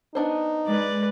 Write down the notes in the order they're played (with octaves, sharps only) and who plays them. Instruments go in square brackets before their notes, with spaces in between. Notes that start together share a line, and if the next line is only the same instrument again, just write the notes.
[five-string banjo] B3 D4 C5 [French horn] D#4
[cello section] G#3 [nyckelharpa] B4 D5